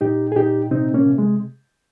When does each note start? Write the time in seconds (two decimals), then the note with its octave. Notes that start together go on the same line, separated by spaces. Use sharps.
0.01 A#2 D#4 G4
0.32 G#4
0.36 A#2 D#4 G4
0.71 C3 C4 D#4
0.94 A#3 C#4
1.06 C3
1.18 G#3